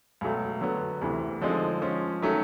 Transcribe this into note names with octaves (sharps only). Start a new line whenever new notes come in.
C#2 B2 F#3 A3
D3 F#3 B3
D2 C3 E3
D3 F3 G#3 C4 D#4
F3 G#3 C#4
D#3 F#3 A3 C#4